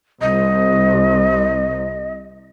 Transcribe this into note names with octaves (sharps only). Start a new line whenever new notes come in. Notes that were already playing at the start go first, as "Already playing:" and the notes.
C2 D#5